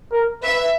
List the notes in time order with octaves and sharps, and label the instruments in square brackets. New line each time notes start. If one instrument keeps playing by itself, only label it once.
[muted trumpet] A#4
[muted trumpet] B4 [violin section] E5